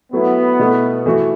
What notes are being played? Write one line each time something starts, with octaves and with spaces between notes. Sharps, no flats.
F#3 A3 B3 E4
B2 A3 E4
E3 A3 F#4